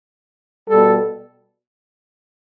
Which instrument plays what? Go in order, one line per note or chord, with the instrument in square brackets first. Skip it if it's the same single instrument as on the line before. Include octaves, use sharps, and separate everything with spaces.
[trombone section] B2 G3 A4